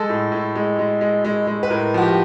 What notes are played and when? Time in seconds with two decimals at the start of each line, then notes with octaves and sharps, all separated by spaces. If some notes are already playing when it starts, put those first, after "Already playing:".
Already playing: G#3 A4
0.09 A2
0.32 A2
0.55 G#3
0.79 G#3
1.01 G#3
1.25 G#3
1.47 G#3
1.63 B4
1.70 A2 A#4
1.94 F3 F#4
2.02 G4